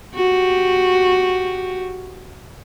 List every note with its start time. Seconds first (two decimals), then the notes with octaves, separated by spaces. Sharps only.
0.15 F#4 G4